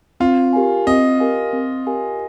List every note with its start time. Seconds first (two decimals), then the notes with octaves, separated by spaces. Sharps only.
0.20 C4 F4
0.53 G4 A#4 F5 G#5
0.87 C4 D#5
1.20 G4 A#4 F5 G#5
1.53 C4
1.87 G4 A#4 F5 G#5